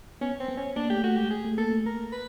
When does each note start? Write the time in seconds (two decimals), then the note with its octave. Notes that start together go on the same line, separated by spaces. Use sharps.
0.21 B3 C#4
0.40 C4
0.48 B3
0.57 C#4
0.76 A#3 D4
0.90 A3 G4
1.03 A3 F#4
1.16 G#3 G4
1.30 G#4
1.45 A3
1.58 A#3 A4
1.71 A3
1.85 A#3 A#4
2.12 B4